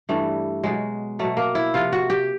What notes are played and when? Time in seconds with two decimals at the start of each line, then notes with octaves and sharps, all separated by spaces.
0.09 G2 E3 G3 A3
0.64 B2 F#3 G#3
1.19 B2 F#3 A3
1.37 A#3
1.55 E4
1.74 C3 F3 F4
1.93 F#4
2.10 G4